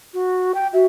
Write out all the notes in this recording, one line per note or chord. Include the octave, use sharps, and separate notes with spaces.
F#4
G5
F#4 E5